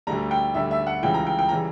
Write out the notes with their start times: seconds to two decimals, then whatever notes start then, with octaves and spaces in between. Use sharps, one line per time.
0.07 D2 D3 G3 A#5
0.31 G5
0.54 D2 D3 G3 E5
0.71 E5
0.87 F#5
1.03 C#2 C#3 E3 G3 G5
1.14 A#5
1.27 G5
1.39 G5
1.49 C#3 E3 G3 A#5